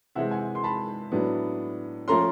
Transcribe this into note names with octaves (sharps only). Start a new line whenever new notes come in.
C3 E3 G#3 C4 E5 F#5
F#5 G#5
C6
A5 B5
A2 F#3 B3 D4
F3 A3 C#4 A#5 C6